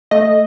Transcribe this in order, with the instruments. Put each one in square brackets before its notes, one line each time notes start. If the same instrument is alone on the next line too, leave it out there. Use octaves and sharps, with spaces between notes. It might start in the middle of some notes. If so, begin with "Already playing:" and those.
[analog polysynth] A3 D#5